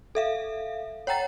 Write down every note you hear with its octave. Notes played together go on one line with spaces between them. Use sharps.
A4 E5 F5
C#5 F#5 G5 A#5 A6